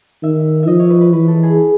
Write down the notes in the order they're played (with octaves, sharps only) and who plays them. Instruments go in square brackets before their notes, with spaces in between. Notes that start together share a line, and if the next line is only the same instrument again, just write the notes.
[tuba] D#3 [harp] E5
[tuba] F3 [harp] D#5 E5
[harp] C#5
B4
B4
[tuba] E3 [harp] B4
[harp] A4
G#4